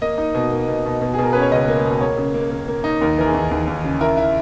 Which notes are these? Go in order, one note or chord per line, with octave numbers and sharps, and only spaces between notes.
A#3 D#5
D#4
B2
A#3
B2
B2
B2
G#4
B2
A#4
C#4 B4
C#5
C#2 D#5
A#3
B2
A#3 C#5
C#3
A#3
A#3
A#3
D#4
D#2 A#4
E3 A#4
G#4
D#2
D#2
D#2
C#3
E4 A#4
E4